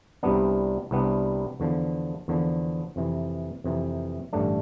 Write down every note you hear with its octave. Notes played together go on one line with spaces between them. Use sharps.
C2 C3 G3 B3 D4
C2 C3 G3 B3 D4
E2 D3 F3
E2 D3 F3
F2 C3 E3
F2 C3 E3
A1 G2 D3 A3 D4